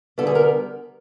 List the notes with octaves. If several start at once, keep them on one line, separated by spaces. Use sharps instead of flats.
D3 G3 B3 A4
G#4
A#4